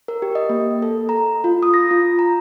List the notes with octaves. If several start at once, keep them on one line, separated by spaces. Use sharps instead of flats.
A#4
G4
D#5
A#3
A4
A#5
F4
D#6
A#6
F4
A#5